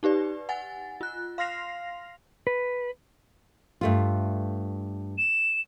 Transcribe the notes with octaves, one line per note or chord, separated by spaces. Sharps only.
D#4 G4 B4 D5
F#5 G#5 A6
F4 F#6
F5 C6 F6 A#6 C7 F7
B4
G2 A3 F4
E7